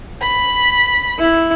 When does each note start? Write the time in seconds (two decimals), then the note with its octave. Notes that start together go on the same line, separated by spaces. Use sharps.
0.20 B5
1.19 E4